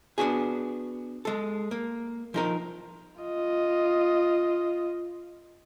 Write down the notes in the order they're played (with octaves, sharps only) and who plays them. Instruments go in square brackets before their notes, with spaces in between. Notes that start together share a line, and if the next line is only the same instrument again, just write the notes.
[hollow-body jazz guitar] B3 D4 F#4 G#4
G#3 A4
A#3
F3 D#4 A#4
[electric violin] F4 D#5